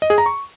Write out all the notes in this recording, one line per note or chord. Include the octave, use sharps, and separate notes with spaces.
D#5
G#4
A#5
C#6